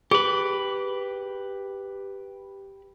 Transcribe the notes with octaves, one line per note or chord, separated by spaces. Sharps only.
G4 G#4 B4